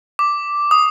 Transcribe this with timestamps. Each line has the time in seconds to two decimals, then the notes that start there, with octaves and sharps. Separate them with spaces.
0.19 D6
0.71 D#6